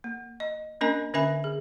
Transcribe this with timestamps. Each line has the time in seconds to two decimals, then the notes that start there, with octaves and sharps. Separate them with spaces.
0.04 A#3
0.40 D#5
0.81 A#3 C#4 D4 A#4 D#5 G#5
1.14 D3 C#4 A#4 E5 G#5 B5
1.44 G#4